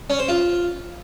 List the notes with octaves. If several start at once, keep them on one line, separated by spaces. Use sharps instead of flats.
C#4
C5
F4